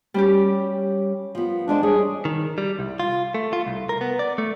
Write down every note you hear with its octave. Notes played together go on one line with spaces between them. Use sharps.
G3 C#4 G4
F3 B3
E2 G#3 D4 C5
G3 D4 G#4 C#5
D#3
G3
C2
F4
A3
F4
C2
A#4
B3
D5
A3